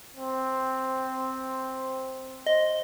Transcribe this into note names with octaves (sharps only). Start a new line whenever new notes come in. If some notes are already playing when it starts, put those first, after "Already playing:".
C4
C5 D#5